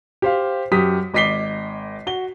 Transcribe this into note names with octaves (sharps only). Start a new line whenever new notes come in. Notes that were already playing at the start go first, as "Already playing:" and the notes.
G4 C5 F5
F#2 G4 D#6 B6
G#1 D#5 D6 B6 C7 G7
F#4 G7